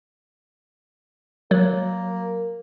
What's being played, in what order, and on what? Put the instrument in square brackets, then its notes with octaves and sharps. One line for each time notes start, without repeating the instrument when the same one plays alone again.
[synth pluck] F#3 [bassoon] A#3